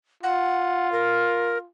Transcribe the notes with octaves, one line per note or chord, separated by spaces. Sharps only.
F4 F#5
A#4